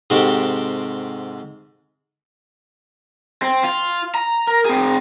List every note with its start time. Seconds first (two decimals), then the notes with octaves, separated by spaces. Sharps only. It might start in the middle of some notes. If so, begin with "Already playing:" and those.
0.10 G#2 C3 C4 F#4 G4 A4
3.42 C4
3.64 F4
4.15 A#5
4.47 A#4
4.65 C4 G#4